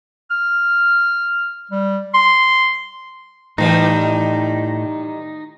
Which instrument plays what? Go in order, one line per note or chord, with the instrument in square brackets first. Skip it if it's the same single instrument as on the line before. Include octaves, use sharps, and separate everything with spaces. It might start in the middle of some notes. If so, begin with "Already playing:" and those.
[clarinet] F6
G3
C6
[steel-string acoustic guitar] A2 [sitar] D#3 E3 G3 [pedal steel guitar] D#4